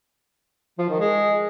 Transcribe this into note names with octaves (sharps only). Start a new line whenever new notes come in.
F3
D#3
G#3